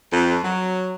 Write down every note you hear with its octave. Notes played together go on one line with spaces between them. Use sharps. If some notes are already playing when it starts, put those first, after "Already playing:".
F2
F#3